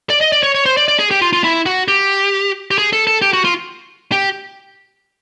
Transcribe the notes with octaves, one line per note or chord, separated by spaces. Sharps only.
D5
D#5
D5
C#5
C#5
C5
D5
D5
G#4
G4
F4
F4
E4
F#4
G4
G4
G#4
A4
A4
G4
F#4
F4
G4